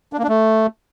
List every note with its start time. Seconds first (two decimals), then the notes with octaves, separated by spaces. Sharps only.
0.13 D4
0.18 A#3
0.23 D4
0.29 A3